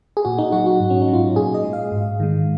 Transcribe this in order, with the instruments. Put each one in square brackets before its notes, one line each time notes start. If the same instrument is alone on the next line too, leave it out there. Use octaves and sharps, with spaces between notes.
[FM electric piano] G#4
A#2 F#4
D#4
F#3 F#4
F#4
G#2
C#4
D#4
F#3
F4
F#4
A#2 G#4
D#5
G#3
F5
G#2
D#3 G#3